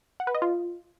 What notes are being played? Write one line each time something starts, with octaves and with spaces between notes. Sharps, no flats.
F#5
B4
D#5
F4